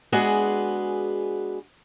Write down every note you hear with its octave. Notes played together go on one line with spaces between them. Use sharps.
G#3 B3 D4 F#4 G#4